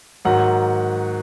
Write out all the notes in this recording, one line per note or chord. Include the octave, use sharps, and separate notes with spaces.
G#2 D#3 F#3 F#5